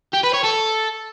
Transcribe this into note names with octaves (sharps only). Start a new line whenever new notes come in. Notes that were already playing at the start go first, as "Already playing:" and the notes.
G4
B4
C#5
A4